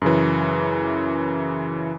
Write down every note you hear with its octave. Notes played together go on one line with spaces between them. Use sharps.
F#2 C#3 E3